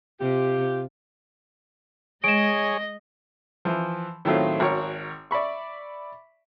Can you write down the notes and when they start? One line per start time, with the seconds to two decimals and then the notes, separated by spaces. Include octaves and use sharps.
0.21 C3 F4 G4
2.24 G#3 G#4 C#5 D#5 D7 E7
3.65 E3 F3
4.25 A2 D#3 F#3 A3 C4 F4
4.60 G#1 F#4 A#4 C#5 C#6
5.31 D5 E5 B5 C#6